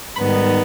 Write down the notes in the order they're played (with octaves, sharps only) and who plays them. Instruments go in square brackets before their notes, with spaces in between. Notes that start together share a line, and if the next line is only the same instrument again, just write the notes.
[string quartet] G#2 D#3 G3 B3 B5